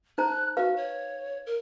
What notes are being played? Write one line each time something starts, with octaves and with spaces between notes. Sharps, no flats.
D#4 C5 A#5 F#6
F#4 B4 F5
C#5
A#4